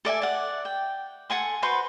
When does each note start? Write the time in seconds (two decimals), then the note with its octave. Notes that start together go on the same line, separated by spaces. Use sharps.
0.05 A4 D5 E5 G#5
0.22 D5 F#5
0.65 G5
1.30 A4 F#5 G#5 C6
1.62 F#4 B4 C5 C6